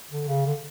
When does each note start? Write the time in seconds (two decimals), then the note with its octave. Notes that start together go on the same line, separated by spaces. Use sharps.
0.11 D3
0.28 C#3
0.46 D3